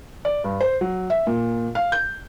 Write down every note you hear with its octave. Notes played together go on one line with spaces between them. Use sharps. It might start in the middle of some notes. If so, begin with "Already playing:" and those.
D5
G2
C5
F#3
E5
A#2
F5
G6